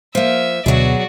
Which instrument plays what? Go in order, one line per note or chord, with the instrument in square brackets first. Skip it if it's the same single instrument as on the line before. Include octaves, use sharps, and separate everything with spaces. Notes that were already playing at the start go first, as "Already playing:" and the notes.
[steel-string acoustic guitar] F3 A#3 [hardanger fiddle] E5
[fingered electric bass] D2 [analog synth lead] B2 [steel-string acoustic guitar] F#3 G#4 [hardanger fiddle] F#4 D5